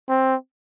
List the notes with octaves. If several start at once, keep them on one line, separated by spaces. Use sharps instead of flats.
C4